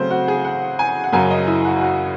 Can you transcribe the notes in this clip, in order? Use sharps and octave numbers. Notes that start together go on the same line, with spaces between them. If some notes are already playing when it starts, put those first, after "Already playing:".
Already playing: C#3 F#3 A3 C4 C5
F#4
G#4
F#5
G#5
F#5
F#2 C#3 F#3 G#5
D#5
E4
F#4
F#4